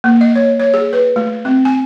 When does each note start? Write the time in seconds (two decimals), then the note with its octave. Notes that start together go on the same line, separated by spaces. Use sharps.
0.04 A#3
0.21 D#5
0.36 C#5
0.60 C#5
0.74 G#4
0.93 B4
1.16 A3
1.45 C4
1.65 G#5